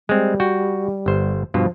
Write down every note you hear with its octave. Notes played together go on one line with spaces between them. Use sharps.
G3 G#3 C4
F#4 G5
G1 C5
G2 B2 F3 F4